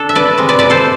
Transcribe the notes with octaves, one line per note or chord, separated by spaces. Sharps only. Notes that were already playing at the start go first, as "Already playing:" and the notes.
Already playing: D4 A4
E5
B4 D5
C3 G#3
B4 D5
B4 D5
A4 C5